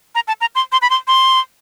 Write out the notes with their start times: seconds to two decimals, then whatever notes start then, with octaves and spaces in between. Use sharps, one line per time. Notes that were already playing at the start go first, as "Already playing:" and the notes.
0.15 A#5
0.28 A5
0.41 A#5
0.55 C6
0.72 C6
0.82 B5
0.90 C6
1.08 C6